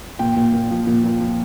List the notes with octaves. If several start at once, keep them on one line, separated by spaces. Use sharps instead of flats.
A#2 G5
A#2
A#2
F3
A#2
A#2
F3